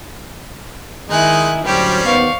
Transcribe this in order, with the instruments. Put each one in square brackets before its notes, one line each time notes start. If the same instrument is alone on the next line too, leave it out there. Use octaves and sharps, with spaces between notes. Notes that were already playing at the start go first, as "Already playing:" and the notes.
[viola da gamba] D#3 E4 [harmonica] G#3 D#4 [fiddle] G#5 F#6
[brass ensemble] D2 A2 F#3 [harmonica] G3 C#4 [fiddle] G4 [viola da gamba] C5 D5
[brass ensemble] D#2 B3 [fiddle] F5 C#6